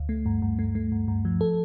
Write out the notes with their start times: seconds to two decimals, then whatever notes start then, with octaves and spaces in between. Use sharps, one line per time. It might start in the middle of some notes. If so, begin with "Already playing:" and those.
Already playing: D2
0.09 A3
0.26 G2
0.42 G2
0.59 A3
0.75 A3
0.92 G2
1.08 G2
1.25 F3
1.41 A4